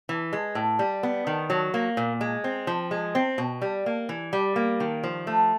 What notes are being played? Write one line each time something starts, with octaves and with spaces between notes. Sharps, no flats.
E3
G#3
A2
G3
B3
D#3
F#3
A#3
A#2
G#3
C4
F3
G#3
C4
B2
G3
A#3
E3
G3
A#3
D#3
F3
A3